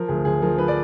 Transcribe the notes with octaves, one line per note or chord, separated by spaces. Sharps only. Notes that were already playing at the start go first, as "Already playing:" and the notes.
Already playing: F3 A#4
D2 G#4
D2 G#4
F3 A#4
F3 B4
D5